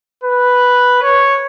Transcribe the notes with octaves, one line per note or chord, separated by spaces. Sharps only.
B4
C#5